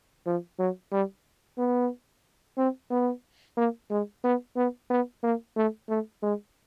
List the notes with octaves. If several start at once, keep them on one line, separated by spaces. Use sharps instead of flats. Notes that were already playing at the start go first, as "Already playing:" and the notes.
F3
F#3
G3
B3
C4
B3
A#3
G#3
B3
B3
B3
A#3
A3
A3
G#3